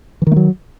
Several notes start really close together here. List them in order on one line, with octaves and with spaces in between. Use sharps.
E3 D#3 A3 F#3